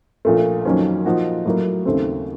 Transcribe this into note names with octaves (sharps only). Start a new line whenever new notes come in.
A#1 A#2 A3
F2 D#3 F#3 A#3 C#4
A#2 F3 A#3 D#4 F#4
A2 F#3 A#3
D#2 C#3 A3 C4